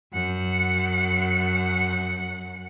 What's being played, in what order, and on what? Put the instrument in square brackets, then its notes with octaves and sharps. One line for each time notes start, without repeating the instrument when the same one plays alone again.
[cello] F#2 F#5